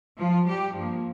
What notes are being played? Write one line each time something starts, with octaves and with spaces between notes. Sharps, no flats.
F3 F4
G3 G4
G2 F3 A#3